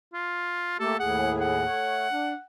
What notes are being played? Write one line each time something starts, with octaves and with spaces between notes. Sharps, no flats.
F4
A3 A#3 G4 A4
D#2 A2 G#4 F#5
F#5
A3 C#5
D4